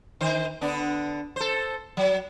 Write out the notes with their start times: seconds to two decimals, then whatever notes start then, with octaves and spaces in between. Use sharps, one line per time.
0.21 D#3 C5
0.61 D3 B3 D4
1.36 A4 C5
1.97 F#3